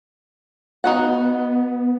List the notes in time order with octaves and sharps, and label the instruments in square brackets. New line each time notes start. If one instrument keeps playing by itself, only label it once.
[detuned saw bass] B3 [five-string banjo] D#4 F#4 F#5